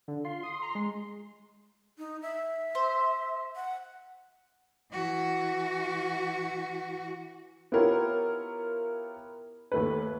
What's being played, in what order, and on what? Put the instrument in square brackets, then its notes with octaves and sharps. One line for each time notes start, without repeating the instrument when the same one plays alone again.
[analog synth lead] D3
[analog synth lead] F4 [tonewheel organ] C6
[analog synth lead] D#6
A#5
G#3
[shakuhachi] D#4
E5
[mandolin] C5
[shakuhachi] F#5
[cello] E3 F#4
[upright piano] B3 E4 F4 G4 A#4 C#5
D#2 A3 B4